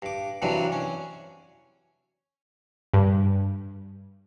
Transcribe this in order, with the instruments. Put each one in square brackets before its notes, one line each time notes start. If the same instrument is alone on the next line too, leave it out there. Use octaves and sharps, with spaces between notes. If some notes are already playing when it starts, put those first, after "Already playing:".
[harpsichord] G2 D6
G2 C3 E3 F#3 G3 D4
C#4
[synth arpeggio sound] G2